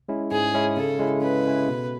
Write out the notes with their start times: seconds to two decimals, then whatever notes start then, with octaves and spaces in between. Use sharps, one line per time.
0.09 G#3 C#4 E4
0.31 G#2 G#4
0.54 G#3 C#4 E4
0.77 C#3 A4
0.99 G#3 C#4 E4
1.22 C#3 B4
1.45 G#3 C#4 E4
1.68 B2